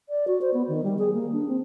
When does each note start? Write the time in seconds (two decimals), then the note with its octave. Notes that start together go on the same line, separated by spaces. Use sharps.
0.09 D5
0.27 F#4
0.41 C5
0.54 B3
0.68 D#3
0.84 G3
0.98 G#4
1.13 A#3
1.32 D4
1.48 C4